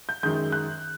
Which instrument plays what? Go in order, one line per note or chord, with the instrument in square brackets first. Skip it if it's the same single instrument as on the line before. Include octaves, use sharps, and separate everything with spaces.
[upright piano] G6
F#2 D#3 G#3 G6
F#6